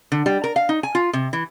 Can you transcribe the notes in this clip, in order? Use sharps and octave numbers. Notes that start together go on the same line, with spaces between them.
D3
G3
A#4
F5
D#4
G#5
F4
C3
E3